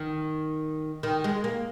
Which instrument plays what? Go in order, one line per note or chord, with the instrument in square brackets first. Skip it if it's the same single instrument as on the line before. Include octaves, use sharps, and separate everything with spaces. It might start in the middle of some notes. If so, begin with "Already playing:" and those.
Already playing: [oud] D#3
D#3
G#3
A#3